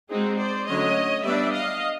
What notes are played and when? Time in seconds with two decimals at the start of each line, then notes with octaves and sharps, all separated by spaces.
0.10 G#3 C4 D#4 F#4 G#4
0.38 C5 D5
0.67 D3 F#3 A3 C#4 C#5 D#5
1.24 G3 B3 D4 D5 E5
1.52 D#5 F5